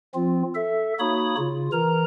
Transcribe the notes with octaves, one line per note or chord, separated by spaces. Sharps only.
F3 C4 F4
A4 E5
A#3 D#4 F#4 C#5 B5 D#6
C#3 F4
E3 A#4 A#5